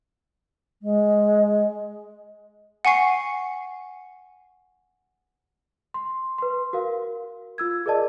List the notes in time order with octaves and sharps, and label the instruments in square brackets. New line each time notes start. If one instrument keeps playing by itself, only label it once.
[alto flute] G#3
[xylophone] F#5 G#5 C#6 C7
[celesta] C6
B4 C6
F#4 A#4 F5
F4 E6 G#6
G#4 A#4 D5 D#5 A5